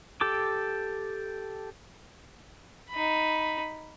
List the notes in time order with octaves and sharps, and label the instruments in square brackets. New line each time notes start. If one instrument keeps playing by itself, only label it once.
[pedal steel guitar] G4 A4 D6
[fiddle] D#4 B5